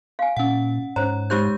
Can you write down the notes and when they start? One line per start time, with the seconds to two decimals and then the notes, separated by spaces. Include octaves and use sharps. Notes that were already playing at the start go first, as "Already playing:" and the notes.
0.19 F5 G#5
0.37 A#2 C#4 F#5
0.96 G#2 C#4 C5 C#5 A#5
1.30 G#3 D#4 G4 C5 C#6 G6